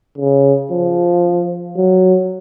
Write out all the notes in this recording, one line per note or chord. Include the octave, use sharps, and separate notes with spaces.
C#3
F3
F#3